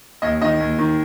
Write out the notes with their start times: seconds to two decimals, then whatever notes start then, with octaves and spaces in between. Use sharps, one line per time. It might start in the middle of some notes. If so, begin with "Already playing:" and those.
0.22 D#2 D#5
0.42 D#3 D#5
0.60 D#2
0.79 D#3